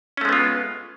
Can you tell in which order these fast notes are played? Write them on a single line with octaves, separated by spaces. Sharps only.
C#4 A3 G#3 B3 F4